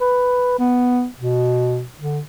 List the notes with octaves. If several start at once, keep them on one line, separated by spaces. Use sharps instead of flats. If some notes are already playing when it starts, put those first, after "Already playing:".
B4
B3
B2
D3